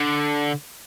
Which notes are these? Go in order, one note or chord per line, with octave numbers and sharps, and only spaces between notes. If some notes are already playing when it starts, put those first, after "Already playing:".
Already playing: D3